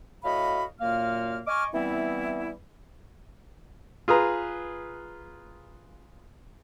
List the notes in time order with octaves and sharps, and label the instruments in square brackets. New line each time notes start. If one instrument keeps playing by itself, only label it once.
[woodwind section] A2 F#4 D#5 F5 B5
F#2 A#2 A#3 F5 F6
D#5 G#5 C#6 D6 F6
E3 G3 B3 C4 E4
[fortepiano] F4 G#4 B4 A#5